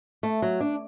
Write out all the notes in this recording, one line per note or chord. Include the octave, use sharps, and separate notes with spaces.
A3
F#3
D4